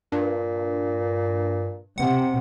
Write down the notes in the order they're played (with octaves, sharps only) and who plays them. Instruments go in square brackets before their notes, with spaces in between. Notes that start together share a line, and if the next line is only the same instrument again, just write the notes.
[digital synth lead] G2 [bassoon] A#2
[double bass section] C3 [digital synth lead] F#5